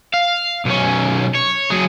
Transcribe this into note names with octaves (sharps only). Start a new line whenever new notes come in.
F5
B1 C#4
C#5
F#3 G#4